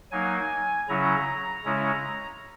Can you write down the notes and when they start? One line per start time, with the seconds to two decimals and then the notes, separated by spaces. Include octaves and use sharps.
0.11 F#3 A#3 D#4 G#5
0.89 C#3 F#3 C#4 E4 A#5
1.65 C#3 G#3 C#4 E4